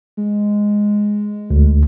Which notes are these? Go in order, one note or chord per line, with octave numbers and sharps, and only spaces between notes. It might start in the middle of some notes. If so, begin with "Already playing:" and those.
G#3
D2